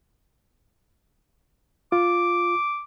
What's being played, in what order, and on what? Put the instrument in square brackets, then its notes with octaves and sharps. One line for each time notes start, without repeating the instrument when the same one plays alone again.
[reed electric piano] F4 [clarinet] D6